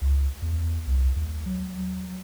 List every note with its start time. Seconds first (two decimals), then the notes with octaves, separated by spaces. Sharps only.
0.01 C#2
0.42 E2
0.87 C2
1.16 D#2
1.46 F#3